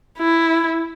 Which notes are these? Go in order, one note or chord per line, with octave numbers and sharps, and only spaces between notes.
E4